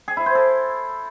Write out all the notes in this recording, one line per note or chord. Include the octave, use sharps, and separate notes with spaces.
G#4
E4
C5
A4